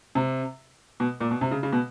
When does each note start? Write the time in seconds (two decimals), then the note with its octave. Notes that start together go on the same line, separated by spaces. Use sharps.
0.15 C3
1.00 B2
1.20 A#2
1.31 B2
1.41 C3
1.51 C#3
1.63 C#3
1.72 B2